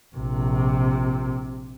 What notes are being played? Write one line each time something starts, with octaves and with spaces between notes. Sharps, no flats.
A#1 C3